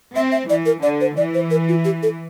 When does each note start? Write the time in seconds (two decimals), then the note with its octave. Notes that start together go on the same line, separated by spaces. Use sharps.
0.16 C4 E5
0.32 E5
0.49 E3 D5
0.66 A#4
0.83 D3 D5
1.01 C5
1.17 E3 D5
1.34 C5
1.51 A#4
1.69 F4
1.85 G4
2.03 A4